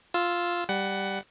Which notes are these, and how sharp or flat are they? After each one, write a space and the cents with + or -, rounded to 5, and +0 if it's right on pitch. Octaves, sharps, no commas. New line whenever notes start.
F4 +0 E6 +0
G3 +0 F#5 +15